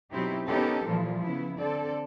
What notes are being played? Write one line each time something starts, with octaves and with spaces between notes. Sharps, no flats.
B2 F#3 C4 D#4 E4 G4
B3 C#4 D#4 G4 A4 A#4
A#2 E3 F3 G3
C#3 B3 E4
D3 C4 A4 D5